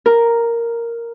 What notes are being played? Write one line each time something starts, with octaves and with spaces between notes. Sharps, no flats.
A#4